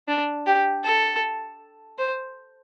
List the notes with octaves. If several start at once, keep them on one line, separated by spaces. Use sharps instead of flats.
D4
G4
A4
C5